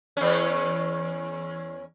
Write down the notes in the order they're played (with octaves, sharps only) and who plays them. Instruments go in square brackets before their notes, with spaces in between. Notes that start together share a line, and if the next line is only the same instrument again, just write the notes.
[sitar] E2 C#4